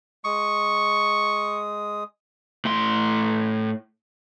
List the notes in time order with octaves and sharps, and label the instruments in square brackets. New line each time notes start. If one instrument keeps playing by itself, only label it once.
[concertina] G#3 D#6 [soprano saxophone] C#6
[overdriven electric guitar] A2 C6